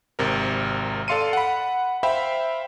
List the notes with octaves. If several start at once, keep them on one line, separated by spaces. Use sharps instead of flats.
G#1 C3 A#4
A4 D5 F5 C6 C#7 D#7
F#5 B5
C5 E5 F5 G5 B5